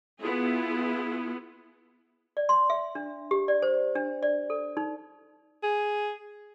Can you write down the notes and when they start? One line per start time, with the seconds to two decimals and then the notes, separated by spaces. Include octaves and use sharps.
0.20 B3 E4 F4 G#4
2.37 D5
2.49 C6
2.70 E5
2.95 D4
3.31 G4
3.48 D5
3.62 C5
3.95 D4
4.23 D5
4.50 A4
4.77 D#4
5.63 G#4